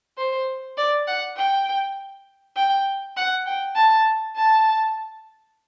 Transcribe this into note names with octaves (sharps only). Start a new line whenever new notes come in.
C5
D5
F#5
G5
G5
F#5
G5
A5
A5